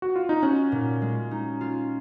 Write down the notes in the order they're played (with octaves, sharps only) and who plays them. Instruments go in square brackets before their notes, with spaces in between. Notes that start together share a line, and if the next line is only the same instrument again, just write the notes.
[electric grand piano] F#4
F4
D#4
[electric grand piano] C#4 [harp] F#4
[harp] A#2
G#3
D#4
F4